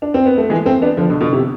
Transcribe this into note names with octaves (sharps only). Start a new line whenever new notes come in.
D4
C4
B3
A3
E3 G#3
A3 C4
B3 D4
D3 F3
B2 D3
B2 D3
A2 C3